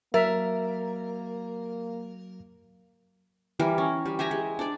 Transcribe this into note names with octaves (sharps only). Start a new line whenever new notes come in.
F#3 A#3 A#4 E5 A6
E3 G3 A#4
C#4
G3
G4 E5 G#5 A#5
G#3
D4 D5